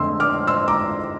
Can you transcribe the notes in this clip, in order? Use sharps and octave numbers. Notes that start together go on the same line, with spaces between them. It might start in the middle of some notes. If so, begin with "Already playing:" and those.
Already playing: F2 D3 A3 C6 E6
D6 F6
C6 E6
A#5 D6